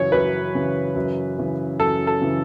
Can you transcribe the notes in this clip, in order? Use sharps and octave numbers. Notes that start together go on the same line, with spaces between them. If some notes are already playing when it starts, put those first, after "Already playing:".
Already playing: F#2 C#3 E3 C#5
F#2 B4
C#3 E3
F#2
C#3 E3
F#2 A4
A4
C#3 E3